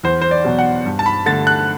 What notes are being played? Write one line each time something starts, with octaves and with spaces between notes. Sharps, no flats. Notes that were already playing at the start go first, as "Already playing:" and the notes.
E2 C5
C5
D5
B2 F#3
F#5
G2
A5
B5
D3 A3 A6
F#6